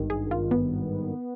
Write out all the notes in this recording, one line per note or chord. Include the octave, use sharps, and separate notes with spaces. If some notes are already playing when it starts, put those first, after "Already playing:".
Already playing: G#1 G2 D#3
G#4
F4
B3